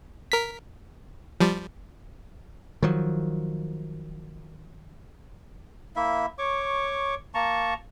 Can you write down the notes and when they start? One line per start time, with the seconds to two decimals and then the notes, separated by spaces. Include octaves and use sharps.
0.32 A#4 B6
1.40 F3 G3
2.83 D#3 F3 F#3
5.96 A#3 E4 E5
6.38 C#5 C#6 D6
7.34 A#3 A5 A#5 C#6